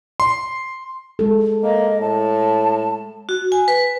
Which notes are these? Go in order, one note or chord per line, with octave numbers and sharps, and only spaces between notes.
C6
G#3 A4
A#3 D#5
A2 A5
F#4
G#5
B4